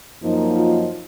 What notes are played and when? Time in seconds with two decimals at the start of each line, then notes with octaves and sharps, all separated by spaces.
0.22 F#2 F3 A#3 D#4
0.54 F4